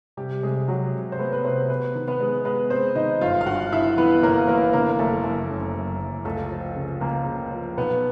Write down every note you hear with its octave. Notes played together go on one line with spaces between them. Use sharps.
C3 G3 G4
C3 G#3 G#4
C3 F#3 F#4
C3
C5
A3 B3 B4
B4
C3 C4 C5
B3 B4
D#3
B3 B4
G#3
G#3 B3 B4
G#3 C4 C5
D#3 D#4 D#5
G1 F4 F5
F5
G2 F#4 F#5
G2 E4 E5
E3 B3 B4
G1 A#3 A#4
E3 A#3 A#4
D3 A#3 A#4
A#4
F#1 A3 A4
F#1 A3 A4
F#2
F#1
F#1
C#2 A3 A4
F3
C#3
C#2 A#3 A#4
C#3
F3
B1 B3 B4